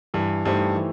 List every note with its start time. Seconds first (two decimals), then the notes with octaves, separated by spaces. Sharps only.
0.14 G2 E3
0.45 G2 A3 D#4 G4 C5
0.76 E3